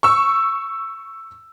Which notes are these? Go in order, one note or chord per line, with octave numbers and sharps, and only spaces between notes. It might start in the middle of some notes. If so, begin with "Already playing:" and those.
C#6 E6